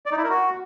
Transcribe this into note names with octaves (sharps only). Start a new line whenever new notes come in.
D5
D#4
E4
A#4
F#4